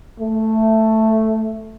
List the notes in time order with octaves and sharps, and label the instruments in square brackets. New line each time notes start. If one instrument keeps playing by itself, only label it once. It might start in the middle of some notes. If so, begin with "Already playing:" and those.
[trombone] A3